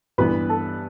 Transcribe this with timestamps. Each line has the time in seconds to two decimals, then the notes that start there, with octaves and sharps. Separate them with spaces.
0.18 G2 E3 B3 B4 B5
0.49 A4 A5